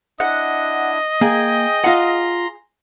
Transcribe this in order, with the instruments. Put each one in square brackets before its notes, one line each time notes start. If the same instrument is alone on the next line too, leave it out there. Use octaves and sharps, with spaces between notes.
[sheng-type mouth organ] D4 E4 [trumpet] D#5 [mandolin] F#5
[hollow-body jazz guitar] A#3 [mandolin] G#4 [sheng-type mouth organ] G5
[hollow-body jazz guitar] F4 F#5 [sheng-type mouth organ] A#5 C6